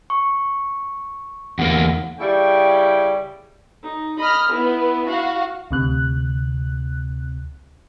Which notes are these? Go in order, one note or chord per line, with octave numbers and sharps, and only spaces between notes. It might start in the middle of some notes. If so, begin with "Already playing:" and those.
C#6
E2 A#3 F#5
C#3 G3 E4 G5
D#4
D#5 B5 F6
B3 E4
F#4 F5
D2 C3 F#6